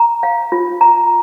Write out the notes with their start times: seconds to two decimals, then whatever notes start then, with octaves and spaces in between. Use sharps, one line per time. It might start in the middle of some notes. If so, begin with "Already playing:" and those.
Already playing: A#5
0.23 F5
0.52 F4
0.81 A#5